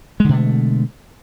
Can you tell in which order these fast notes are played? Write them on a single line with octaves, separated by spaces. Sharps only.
G#3 D3 B2 A3